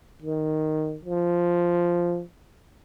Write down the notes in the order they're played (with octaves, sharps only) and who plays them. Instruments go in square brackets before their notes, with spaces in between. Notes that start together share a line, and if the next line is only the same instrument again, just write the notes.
[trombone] D#3
F3